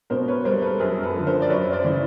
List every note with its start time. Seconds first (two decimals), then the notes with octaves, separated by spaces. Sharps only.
0.10 B2 A#4 C5
0.28 B4 C#5
0.45 G3 A#4 C5
0.62 A4 B4
0.79 F#2 G#4 A#4
1.03 A4 B4
1.15 D3 F3
1.27 A#4 C5
1.42 D5
1.49 F#2 B4 C#5
1.72 C5 D5
1.84 C#3 E3